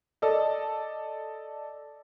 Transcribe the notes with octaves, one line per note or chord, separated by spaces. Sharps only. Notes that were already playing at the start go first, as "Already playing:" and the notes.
A4 D5 D#5